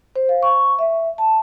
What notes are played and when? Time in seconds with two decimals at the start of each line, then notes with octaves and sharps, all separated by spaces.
0.16 C5
0.29 F5
0.43 C#6
0.79 E5
1.18 A5